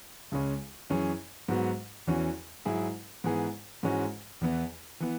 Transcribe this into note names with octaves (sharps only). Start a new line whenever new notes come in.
C#2 C#3 G#3 C#4
F#2 E3 C#4 G#4
G#2 F#3 B3 F#4
E2 E3 C#4 F#4
G#2 F#3 E4 G#4
G#2 E3 B3 G#4
G#2 E3 G#3 C#4 F#4
E2 E3 B3 E4
E3 B3